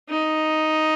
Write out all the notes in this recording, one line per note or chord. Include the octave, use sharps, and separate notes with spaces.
D#4